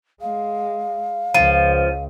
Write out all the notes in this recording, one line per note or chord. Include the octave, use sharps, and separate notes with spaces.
G#3 F5
C#2 F3 D#7